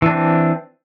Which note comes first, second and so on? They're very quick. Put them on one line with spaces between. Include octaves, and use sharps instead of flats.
E3 D4 C4